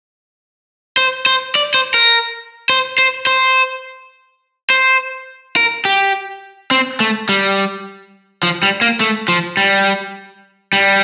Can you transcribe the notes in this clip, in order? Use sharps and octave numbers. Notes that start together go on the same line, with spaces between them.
C5
C5
D5
C5
A#4
C5
C5
C5
C5
A#4
G4
C4
A3
G3
F3
G3
A#3
A3
F3
G3
G3